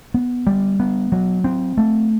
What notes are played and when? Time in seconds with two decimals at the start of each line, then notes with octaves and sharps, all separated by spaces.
0.14 B3
0.47 G3
0.80 B3
1.12 F#3
1.44 C4
1.77 A3